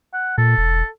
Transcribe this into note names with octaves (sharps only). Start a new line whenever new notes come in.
F#5
A#2 A4
E1